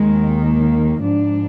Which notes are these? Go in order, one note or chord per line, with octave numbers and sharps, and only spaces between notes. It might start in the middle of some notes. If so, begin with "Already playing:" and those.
Already playing: D#2 D#3 G#3
A#3
G#2 F3 D4